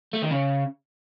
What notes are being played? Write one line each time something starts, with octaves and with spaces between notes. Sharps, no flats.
A3
D#3
C#3